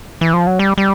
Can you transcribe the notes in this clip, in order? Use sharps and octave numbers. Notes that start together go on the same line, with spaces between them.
E3
F3
F#3
G3
G3